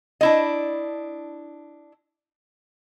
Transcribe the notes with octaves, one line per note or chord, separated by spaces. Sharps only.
D4 E4 D#5